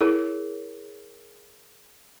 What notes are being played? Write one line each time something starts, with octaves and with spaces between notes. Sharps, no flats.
E4 G#4 A#4 C#5